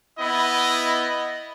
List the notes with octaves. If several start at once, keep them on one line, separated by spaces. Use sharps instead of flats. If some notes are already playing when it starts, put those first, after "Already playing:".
B3 E4 D#5